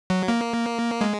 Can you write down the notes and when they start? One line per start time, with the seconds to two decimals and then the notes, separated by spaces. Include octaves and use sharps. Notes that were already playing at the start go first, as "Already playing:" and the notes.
0.10 F#3
0.28 A#3
1.01 G#3